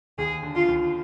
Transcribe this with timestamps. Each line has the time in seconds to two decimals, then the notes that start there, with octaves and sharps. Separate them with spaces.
0.18 D#2 G#4
0.43 D3
0.55 F4
0.68 D#2